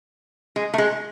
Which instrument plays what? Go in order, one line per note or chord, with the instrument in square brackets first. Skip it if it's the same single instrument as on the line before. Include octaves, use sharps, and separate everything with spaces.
[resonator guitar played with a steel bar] G#3
A3
G#3